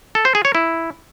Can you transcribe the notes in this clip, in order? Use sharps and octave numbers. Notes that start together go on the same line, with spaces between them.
A4
C5
G#4
C#5
E4